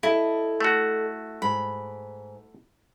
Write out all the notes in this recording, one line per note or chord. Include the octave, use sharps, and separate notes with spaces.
E4 A4 D#5
A3 F#4
G#2 B5